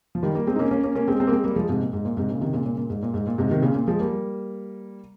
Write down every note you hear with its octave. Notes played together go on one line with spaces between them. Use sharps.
F3
D#3 G3
G3 A#3
G#3 C4
D#4
A#3 C#4
A#3 C#4
A#3 C#4
A#3 C#4
G#3 C4
G#3 C4
A#3
G#3 C4
G3 A#3
F3 G#3
G#2 C3
A#2
G#2
A#2
G#2 C3
A#2 C#3
C3 D#3
A#2 C#3
A#2 C#3
A#2
G#2
A#2
G#2
A#2
G#2 C3
C3 D#3
A#2 C#3
A#2
F3 G#3
G3 A#3